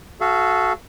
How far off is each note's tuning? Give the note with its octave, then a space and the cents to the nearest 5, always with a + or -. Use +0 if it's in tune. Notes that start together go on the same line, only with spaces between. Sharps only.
F#4 +0 A4 -25 F5 -40